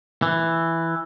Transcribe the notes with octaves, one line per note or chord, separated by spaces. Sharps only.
E3